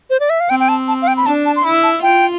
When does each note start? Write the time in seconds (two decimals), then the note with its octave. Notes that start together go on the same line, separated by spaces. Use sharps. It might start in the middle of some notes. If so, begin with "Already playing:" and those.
0.10 C5
0.20 D5
0.30 E5
0.40 F5
0.50 C4 G5
0.60 G5
0.69 A5
0.88 A5
1.02 F5
1.07 G5
1.17 B5
1.26 D4 A5
1.46 A5
1.56 C6
1.64 E4 B5
1.83 A5
2.02 F4 G5